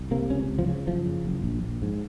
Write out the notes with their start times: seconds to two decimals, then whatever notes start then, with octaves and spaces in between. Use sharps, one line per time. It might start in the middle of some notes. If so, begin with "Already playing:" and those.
Already playing: C2
0.11 C3 A#3
0.30 C#2 C#4
0.49 C#2
0.59 F3
0.68 C#3
0.87 F#1 F3
1.06 C#3
1.25 F#1
1.44 A#1
1.63 A#1
1.82 G#2